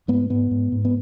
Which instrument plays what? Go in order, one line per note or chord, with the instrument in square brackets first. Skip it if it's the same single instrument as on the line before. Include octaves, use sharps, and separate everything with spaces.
[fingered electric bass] G#2 B3
G#2 B3
G#2
G#2
B3